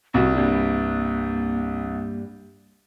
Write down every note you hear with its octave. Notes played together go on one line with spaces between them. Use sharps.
C2 F#4
G2 G3 A#3 D4